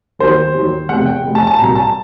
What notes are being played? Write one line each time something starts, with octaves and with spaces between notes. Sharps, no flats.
D#2 D#3 F#3 C5
D#2 D#3 F#3
F1 E2 C3 F#5
G5
F1 E2 C3
A5
A5
C2 A#2 F#3 A#5
A5